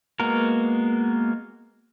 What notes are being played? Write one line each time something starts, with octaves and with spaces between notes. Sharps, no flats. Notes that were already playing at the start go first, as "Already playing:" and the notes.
G#3 A#3 B3 F#4 A#4